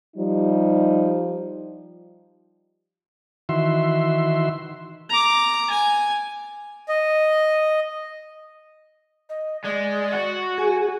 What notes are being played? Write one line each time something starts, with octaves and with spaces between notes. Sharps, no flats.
F3 G3 D#4 G4
D#3 E3 F#4 E5 C6
A#5 D6
G#5
D#5
D#5
G#3 D5
F#4
G#4 G#5